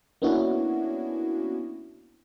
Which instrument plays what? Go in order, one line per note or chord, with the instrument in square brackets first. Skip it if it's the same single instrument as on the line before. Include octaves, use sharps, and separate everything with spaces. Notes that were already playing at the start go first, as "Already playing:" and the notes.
[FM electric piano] A#3 B3 C#4 D4 E4 F#4